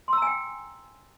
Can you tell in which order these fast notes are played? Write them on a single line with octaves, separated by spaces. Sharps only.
C6 E6 A#5 G#5 G5